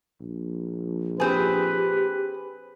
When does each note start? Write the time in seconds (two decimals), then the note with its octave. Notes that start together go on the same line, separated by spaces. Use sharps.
0.20 A#1
1.20 C4 G4 G#4 B4